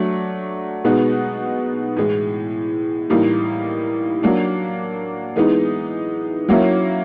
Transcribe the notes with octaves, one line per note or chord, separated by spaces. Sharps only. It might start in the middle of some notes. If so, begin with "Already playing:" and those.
Already playing: F#3 A3 D4
B2 G#3 B3 D#4 F#4
A2 E3 G#3
A2 E3 G3 A#3 D#4
F#3 A#3 D4
E3 G#3 B3 D#4
F#3 A#3 C#4 E4